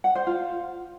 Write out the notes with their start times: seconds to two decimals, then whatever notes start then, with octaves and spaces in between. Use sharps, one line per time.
0.04 F#5
0.15 C5
0.27 F4